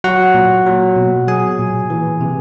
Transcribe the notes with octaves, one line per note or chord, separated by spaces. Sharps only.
F#3 F#4 F#5
A#2
F#3
B2
F#3 G#4 G#5
A#2
E3
C3